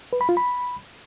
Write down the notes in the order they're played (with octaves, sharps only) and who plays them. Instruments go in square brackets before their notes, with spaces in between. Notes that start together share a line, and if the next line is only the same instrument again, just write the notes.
[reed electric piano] B4
B5
F4
B5